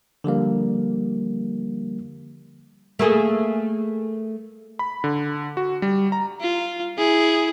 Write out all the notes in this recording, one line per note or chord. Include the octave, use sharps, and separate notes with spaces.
D3 F3 G3 A#3
A3 A#3 G#4
B5
D3
F#4
G3
A#5
F4
E4 G#4